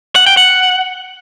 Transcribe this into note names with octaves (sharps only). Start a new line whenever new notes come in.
F#5
G5
F#5